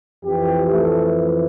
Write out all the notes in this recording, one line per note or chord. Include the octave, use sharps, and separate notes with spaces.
F2 E3 G4
A3